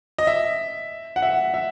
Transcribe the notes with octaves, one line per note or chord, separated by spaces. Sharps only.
D#5
E5
F#5
E5
E5